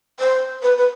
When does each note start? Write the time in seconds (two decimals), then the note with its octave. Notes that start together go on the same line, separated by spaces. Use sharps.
0.19 C5
0.63 B4
0.77 B4